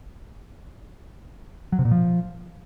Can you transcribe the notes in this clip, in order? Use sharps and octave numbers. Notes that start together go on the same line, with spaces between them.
F#3
C3
A#2
F3